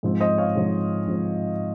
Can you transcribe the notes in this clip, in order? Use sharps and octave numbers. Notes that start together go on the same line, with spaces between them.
G#2 F3 C4
C5 D#5
C#5 F5
G#2 F3 C4
G#2 F3 C4